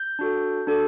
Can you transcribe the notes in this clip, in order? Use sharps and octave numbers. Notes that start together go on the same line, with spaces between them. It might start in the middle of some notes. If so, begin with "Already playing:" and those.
Already playing: G6
D4 F#4 A4
D4 F#4 A4